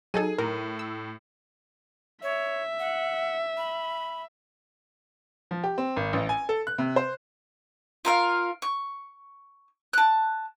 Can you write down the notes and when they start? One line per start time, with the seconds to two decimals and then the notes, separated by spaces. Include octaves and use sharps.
0.14 F#3 D#4 G#4 A4 D#7
0.38 A2 A#4
0.79 E6
2.23 C#5 E5
2.79 F#5
3.57 B5
5.51 F3
5.64 G4
5.78 C4
5.96 G#1
6.13 A1
6.29 G#5
6.49 A4
6.67 F#6
6.78 C3
6.96 C5
8.05 F4 A#4 F5
8.62 C#6
9.93 A5 F#6